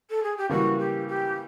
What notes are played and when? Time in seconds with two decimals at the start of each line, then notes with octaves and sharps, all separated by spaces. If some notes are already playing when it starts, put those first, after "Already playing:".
0.10 A4
0.23 G#4
0.37 G4
0.49 C#3 E3 G3 A#3 F#4
0.79 G4
1.08 G4